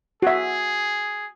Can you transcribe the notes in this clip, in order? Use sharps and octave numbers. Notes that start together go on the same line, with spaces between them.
F#4 G#4 E5